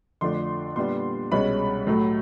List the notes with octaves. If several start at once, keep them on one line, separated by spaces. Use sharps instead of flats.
F2 D3 F3 A3 D4 C6
A#2 G3 B3 D4 C6
C2 B2 G#3 C#4 B5
A2 F#3 A3